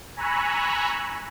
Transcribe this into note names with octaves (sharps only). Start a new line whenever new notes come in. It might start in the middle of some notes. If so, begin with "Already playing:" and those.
G#5 A#5 B5 C#6 E6 F#6